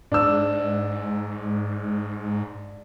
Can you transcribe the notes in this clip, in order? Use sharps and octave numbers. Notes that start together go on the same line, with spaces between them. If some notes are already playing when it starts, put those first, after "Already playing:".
G#2 D4 E6